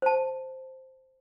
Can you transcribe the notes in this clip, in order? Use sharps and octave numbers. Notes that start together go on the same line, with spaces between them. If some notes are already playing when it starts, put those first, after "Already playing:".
C5 A5